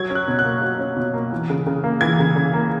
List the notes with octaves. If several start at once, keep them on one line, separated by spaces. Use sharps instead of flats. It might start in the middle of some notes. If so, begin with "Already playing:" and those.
Already playing: F#3 G#6
C#4
F#6
B2
F#6
A#3
F#3
C#4
B2
A#3
E3
C#3
C#3
A#3
E3 G#6
C#3
C#3
A#3